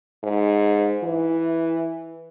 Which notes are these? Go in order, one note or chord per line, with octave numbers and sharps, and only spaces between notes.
G#2
E3